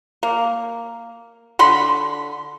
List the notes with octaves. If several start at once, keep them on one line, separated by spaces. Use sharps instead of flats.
A#3
D3 B5 C6